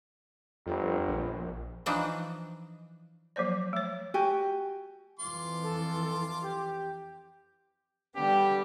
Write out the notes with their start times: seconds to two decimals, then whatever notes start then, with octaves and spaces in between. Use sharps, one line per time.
0.66 G1 F2
1.08 A#1
1.86 E3 F3 D4 D#4 F#4
3.36 F3 F#3 A#3 C5 D5
3.73 A3 C#5
4.14 F#4 G4 G#5
5.20 F2 E3 F4 C6 D6
5.63 A4
6.42 G4
8.16 D3 G3 B3 G4